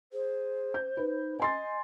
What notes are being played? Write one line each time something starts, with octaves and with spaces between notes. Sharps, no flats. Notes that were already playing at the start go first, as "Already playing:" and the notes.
G#4 C5
G6
D#4 B4
D#5 G#5 C6 A6